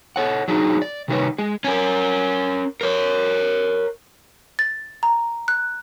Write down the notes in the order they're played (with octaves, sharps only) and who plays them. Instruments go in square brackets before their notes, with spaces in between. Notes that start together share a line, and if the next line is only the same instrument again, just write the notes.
[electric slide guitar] A4 C#5 F#5
F#3 D4 D#4 G#4
D5
C3 D#3 G3 G#4 B4 C#5
G#3 G#4
[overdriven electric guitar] C#4 A#4
A#4 C#5
[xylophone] A6
A#5
F#6